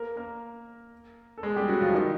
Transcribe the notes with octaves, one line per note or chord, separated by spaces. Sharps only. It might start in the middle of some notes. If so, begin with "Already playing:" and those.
Already playing: A#3 A#4
A#3 A#4
A4
G#3 G#4
G3 G4
F#3 F#4
F3 F4
E4
D#3 D#4